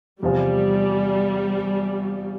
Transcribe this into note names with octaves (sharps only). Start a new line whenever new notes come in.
E2 C3 F3 G3